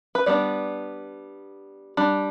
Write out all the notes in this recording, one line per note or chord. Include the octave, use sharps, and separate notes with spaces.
B4
G3 B3 D4 D5
G3 D4